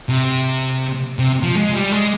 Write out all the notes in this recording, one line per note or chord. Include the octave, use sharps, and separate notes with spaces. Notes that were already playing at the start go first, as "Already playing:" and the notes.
C3
C3
F3
G#3
G3
G#3